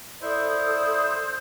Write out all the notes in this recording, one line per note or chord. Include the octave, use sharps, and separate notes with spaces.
E4 A4 C5 D5 D#6